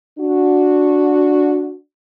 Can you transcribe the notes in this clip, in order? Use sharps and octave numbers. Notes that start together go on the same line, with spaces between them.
D4 F#4